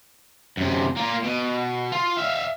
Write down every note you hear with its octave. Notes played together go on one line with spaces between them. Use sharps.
F#2 C3
A#3 F4
B2
F4
E5 F5